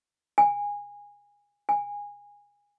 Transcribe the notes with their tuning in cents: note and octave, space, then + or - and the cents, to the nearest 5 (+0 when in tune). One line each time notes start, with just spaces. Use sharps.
G#5 -20
G#5 -20